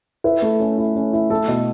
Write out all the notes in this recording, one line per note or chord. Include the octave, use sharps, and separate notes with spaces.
E4 B4
A3
C#4
E4
C#4
E4
A3 A4
B2